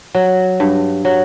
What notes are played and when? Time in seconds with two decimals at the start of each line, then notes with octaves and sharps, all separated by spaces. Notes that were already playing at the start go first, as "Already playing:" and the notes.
0.15 F#3
0.60 G2
1.05 F#3